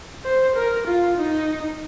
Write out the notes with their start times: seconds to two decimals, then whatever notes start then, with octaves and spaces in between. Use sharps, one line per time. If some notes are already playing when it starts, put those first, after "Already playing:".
0.25 C5
0.56 A#4
0.87 F4
1.18 D#4